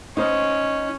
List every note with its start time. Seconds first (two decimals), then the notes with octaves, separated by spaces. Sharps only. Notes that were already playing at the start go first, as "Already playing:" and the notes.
0.17 C#4 D#4 C5 D#5